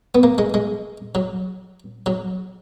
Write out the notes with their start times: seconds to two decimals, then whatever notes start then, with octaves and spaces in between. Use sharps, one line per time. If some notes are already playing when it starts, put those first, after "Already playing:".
0.15 B3
0.23 A#3
0.38 G#3
0.54 G#3
1.15 F#3
2.06 F#3